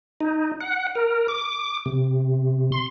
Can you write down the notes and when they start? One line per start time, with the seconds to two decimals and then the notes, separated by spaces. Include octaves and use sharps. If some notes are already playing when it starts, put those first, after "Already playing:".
0.21 D#4
0.61 F#5
0.95 A#4
1.28 D6
1.86 C3
2.72 C6